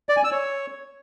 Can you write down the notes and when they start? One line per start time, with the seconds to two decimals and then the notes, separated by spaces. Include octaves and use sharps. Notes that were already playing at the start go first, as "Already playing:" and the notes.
0.09 D5
0.17 G#5
0.24 E6
0.32 C#5